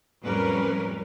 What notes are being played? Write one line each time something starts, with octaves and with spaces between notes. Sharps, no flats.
F2 A2 G3 C#4 A#4 B4